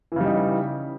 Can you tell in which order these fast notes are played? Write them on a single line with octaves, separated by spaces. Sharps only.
E3 C#3 G3 D#4